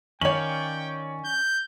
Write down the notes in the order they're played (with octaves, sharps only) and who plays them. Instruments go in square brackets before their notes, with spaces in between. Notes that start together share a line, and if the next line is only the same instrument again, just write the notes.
[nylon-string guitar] D#3 F5 [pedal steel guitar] C#4 D5 [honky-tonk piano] C#5 F#7 [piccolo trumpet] G5
[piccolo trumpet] G6